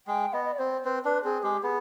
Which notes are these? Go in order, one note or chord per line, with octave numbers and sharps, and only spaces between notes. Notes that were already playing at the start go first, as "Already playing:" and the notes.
G#3 G5
B3 D#5
D#5
D5
C4 C5
C4 B4
D4 B4
C4 G#4
G#3 G4
B3 G#4